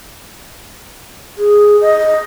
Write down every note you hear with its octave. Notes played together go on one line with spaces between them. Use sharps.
G#4
D#5